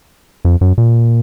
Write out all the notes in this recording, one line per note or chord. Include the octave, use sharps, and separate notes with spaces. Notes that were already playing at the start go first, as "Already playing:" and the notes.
F2
F#2
A#2